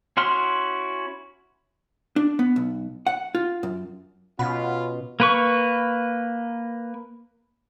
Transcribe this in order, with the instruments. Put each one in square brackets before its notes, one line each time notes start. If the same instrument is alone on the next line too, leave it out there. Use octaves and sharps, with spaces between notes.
[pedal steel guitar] C#4 E4 F#4 C6 F6
[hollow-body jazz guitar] D4
B3
B1
F#5
F4
F#2
[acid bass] B2 [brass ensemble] C#4 F4 [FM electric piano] F#5 B5
[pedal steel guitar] A#3 B4 C#6